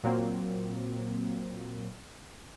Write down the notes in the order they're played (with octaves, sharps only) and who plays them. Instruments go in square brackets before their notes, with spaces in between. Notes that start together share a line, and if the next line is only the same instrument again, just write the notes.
[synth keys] A#2 F#3 A#3 C4